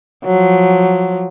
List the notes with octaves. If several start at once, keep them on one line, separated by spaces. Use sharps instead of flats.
F3 F#3